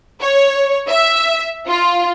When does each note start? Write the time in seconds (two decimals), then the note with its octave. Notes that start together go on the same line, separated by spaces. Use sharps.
0.22 C#5
0.89 E5
1.67 F4